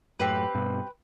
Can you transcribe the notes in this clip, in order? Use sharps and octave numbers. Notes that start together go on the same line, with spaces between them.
F#2 A2 C4 G4 B4
G2 B2